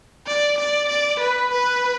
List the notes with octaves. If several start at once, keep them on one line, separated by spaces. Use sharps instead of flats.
D5
D5
D5
B4
B4